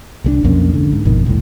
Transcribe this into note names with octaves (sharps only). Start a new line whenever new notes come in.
C2 G#3 D4
B1 F2 A#3 C#4
G#2 D3
G#2
G#1 F2 B2 D#3
F1 C2 A2